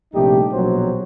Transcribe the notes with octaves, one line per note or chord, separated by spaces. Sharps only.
A#1 C3 G3 A3 D#4 G4
A#1 B2 F#3 C5